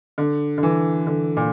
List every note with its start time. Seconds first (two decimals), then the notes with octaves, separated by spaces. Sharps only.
0.18 D3
0.58 D3
0.63 E3
1.07 D3
1.37 A#2